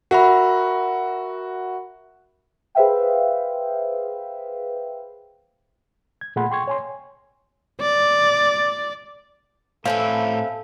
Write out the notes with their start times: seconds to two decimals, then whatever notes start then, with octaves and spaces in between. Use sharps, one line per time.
0.11 F#4 A#4 E5 B5
2.75 G#4 B4 C5 E5 F5 G5
6.21 G#6
6.36 A#2 A3 G#4 F#5 B5 C6
6.51 G5 C6 C#6 G#6
6.68 C#5 G#5 C6
7.81 D5
9.86 A2 C4 E4 A4 B4 C#5 F5 G#5